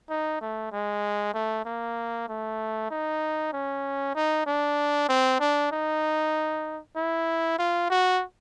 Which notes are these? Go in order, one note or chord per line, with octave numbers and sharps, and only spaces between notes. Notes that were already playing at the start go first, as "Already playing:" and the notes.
D#4
A3
G#3
A3
A#3
A3
D#4
C#4
D#4
D4
C4
D4
D#4
E4
F4
F#4